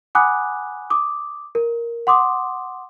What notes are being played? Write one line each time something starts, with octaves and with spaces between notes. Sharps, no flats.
F#5 G#5 B5 D6 D#6 F#6
D6 D#6
A#4
F#5 C6 D6 D#6